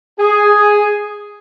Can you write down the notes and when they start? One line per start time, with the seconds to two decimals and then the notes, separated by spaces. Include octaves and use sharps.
0.19 G#4